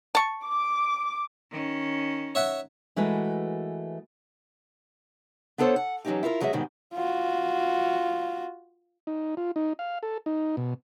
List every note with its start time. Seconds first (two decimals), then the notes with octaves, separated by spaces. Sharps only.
0.15 A5 C#6
0.45 D6
1.51 D#3 C#4
2.35 C#5 E5 F#5
2.96 E3 G#3 A3 F#4 A#4 B4
5.58 B3 D4 F4 A4 C5 C#5
5.76 F#5
6.05 E3 F#3 A#3 C#4 D#4 G4
6.23 E4 F4 A4 A#4
6.40 E2 F#3 G#3 G#4 D5 E5
6.53 G#2 B2 D#3 G3 G#3
6.94 F4 F#4
9.07 D#4
9.37 F4
9.56 D#4
9.79 F5
10.03 A4
10.26 D#4
10.57 B2